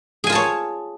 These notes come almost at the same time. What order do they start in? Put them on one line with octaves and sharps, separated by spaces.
G#4 G#5 F4 A5 C#5